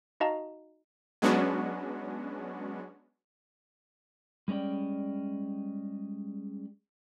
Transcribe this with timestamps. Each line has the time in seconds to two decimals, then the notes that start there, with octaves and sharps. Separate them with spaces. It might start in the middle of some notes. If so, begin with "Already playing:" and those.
0.20 D#4 F#4 D#5 F5 A5 A#5
1.22 F#3 G#3 B3 C#4 D4 F#4
4.48 G3 G#3 C#4 D5 G5